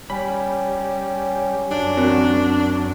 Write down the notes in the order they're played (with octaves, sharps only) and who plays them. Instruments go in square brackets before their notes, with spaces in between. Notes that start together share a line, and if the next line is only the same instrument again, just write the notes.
[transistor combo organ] G3 [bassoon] C#4 [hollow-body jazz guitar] B5
[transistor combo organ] F#2 [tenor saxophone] D4
[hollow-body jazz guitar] C4 F#4 A#4